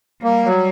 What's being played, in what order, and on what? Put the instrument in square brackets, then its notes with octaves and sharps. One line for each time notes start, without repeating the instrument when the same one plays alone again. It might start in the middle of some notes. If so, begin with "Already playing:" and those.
[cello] G3 [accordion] A#3
[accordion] F#3